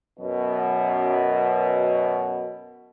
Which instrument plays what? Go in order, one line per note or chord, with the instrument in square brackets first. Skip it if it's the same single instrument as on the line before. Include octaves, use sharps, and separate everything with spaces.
[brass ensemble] F#2 B2